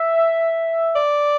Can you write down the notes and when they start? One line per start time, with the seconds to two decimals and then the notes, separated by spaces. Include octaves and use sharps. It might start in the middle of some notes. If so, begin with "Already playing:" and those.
Already playing: E5
0.96 D5